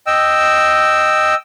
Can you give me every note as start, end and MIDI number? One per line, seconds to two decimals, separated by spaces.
0.07 1.34 75
0.07 1.34 79
0.07 1.34 88